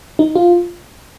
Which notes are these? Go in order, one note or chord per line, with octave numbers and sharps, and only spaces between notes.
D#4
F4